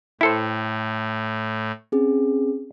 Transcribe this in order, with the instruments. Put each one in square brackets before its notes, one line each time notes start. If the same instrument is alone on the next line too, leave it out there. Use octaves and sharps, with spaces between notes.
[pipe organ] A2 [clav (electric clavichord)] E4 A4 C5 [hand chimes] G5
[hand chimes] C4 C#4 G#4